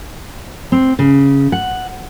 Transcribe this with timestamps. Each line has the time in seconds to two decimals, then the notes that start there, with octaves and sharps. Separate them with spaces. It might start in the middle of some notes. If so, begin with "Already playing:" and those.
0.72 C4
0.99 C#3
1.52 F#5